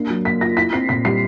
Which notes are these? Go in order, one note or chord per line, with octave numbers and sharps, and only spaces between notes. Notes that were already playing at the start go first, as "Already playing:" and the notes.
Already playing: A#3 D4 C7
F#3
A#3 B6
F4 A#6
E4 B6
C4 C7
A#2 B6
G3 C7